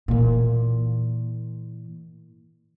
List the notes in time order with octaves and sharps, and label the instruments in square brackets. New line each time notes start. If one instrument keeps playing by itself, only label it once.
[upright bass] A#2 E3